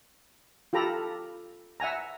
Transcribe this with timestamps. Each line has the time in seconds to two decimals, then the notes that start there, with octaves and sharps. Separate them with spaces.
0.73 F4 G4 A4 A#5 B5
1.80 E5 F#5 G#5 A#5